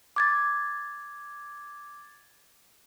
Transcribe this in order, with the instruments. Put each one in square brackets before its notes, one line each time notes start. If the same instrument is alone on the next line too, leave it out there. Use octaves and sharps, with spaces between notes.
[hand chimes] D6 G#6 A6